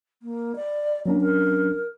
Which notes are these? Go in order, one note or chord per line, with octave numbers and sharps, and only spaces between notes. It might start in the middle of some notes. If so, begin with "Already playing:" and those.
A#3
D5
F#3 A#3 C#4 D4
A#4